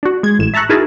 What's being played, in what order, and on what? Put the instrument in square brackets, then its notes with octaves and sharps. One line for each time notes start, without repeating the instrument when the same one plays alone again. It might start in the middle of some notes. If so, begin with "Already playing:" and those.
[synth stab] D4 F#4
G#3 G#6
A1 A2 E7
E5 A5 A#5 C#6 F#6
D#4 E4 F#4 G#4 A#4 A5